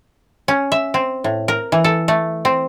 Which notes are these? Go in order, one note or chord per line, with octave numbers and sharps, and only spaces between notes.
C#4
E5
C4
A2
A#4
E3
A4
A3
C4